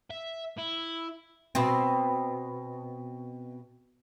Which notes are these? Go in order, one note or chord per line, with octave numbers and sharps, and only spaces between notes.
E5
E4
B2 C4